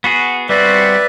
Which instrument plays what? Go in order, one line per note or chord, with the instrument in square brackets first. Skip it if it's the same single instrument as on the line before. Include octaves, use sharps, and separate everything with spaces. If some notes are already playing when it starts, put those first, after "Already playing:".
[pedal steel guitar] B3 F#4 G#4
[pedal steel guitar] G3 C4 F#4 [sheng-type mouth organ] B4 D5 E5